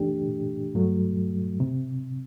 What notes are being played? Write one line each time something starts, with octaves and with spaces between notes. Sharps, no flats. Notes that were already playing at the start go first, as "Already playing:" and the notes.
Already playing: F#2 E3 A3 D4 G4
G2 F#3 A3
C3